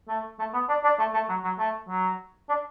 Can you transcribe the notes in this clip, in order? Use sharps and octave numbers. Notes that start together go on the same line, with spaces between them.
A3
A3
B3
D4
D4
A3
A3
F#3
F#3
A3
F#3
D4